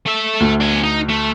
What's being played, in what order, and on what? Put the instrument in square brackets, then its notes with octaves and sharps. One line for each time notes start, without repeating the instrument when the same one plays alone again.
[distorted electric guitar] A3 E5
[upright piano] D2
[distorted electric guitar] D4 G#5
D#4
A3